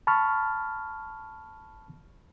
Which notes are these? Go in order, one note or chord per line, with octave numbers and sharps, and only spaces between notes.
A5 B5 C#6 F6